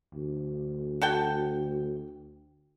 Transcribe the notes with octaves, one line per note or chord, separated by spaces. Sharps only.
D2
F#4 A4 G5